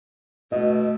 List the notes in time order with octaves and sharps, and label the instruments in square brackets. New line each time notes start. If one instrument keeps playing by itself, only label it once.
[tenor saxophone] B2 [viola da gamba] A3 [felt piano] D#5